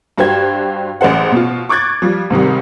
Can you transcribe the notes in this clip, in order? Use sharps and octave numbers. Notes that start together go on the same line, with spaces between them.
G2 F#4 G4 C5 G#6
A1 G#4 C5 F#5
B2 F4
C#6 D6 F#6 G#6 A6
F3 G3
G#2 C3 D#3 G3